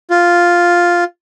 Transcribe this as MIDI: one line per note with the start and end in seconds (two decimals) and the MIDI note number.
0.10 1.04 65